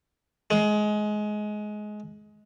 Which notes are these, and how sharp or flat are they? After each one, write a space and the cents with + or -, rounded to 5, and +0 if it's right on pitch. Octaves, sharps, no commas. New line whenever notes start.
G#3 +20